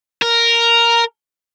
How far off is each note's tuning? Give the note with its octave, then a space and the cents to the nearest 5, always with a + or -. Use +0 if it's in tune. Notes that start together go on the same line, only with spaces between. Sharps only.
A#4 +0